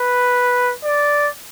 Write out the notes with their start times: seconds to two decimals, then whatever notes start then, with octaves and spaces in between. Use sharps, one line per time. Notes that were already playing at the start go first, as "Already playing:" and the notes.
Already playing: B4
0.84 D5